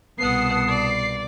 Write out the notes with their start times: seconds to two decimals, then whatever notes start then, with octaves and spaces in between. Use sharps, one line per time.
0.18 C2 B2 B3 F#5 A5 D#6 C7
0.69 D5